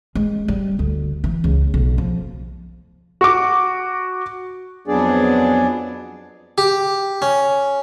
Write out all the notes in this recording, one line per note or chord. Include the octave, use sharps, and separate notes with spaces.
G#3
G3
D2
E3
C#2
B1
F3
F#4 D6
F2 F#3 B3 D4 G#4 D5
G4
C#4